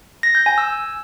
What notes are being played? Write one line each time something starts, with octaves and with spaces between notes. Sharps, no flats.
A#6
G6
G#5
E6